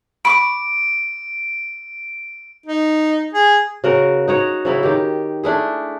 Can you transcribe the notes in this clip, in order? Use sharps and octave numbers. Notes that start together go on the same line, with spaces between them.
B5 C#6 D6 D7
D#4
G#4
C#3 F#4 A#4
D#4 F#4 C#5
C#3 F#3 E4
D#3 G4
A3 D4 E4 G#4